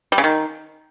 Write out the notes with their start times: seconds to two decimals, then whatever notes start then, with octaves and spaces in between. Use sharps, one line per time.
0.12 G3
0.18 C#3
0.24 D#3